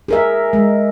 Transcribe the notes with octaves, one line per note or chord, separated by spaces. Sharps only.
G#4 A#4 E5
G#3